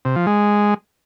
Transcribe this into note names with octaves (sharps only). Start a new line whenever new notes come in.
C3
F3
G#3